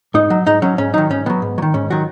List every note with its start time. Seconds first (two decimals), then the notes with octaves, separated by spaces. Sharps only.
0.14 G#2 D#4
0.30 F#3
0.46 G#2 D#4
0.62 F#3 C#4
0.78 G#2 C#4
0.94 D#3 F#3 D#4
1.10 G#2 C#4
1.26 D#3 B3
1.30 F#3
1.42 G#2
1.58 F#3
1.62 D#3
1.74 G#2 C#4
1.90 D#3 F#3 F#4